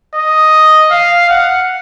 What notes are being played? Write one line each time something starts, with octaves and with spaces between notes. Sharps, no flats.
D#5
F5
F#5